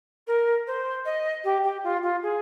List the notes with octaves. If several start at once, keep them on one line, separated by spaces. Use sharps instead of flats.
A#4
C5
D#5
G4
G4
F4
F4
G#4